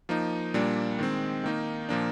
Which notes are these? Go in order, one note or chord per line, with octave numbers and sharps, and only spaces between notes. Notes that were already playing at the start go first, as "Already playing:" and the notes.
F3 A#3 D#4
A#2 G3 A#3 D4
D#3 G#3 C4
D#3 A#3 D#4
A#2 F3 A#3 D4